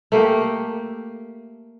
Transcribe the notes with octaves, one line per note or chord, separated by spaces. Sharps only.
A3 A#3 G4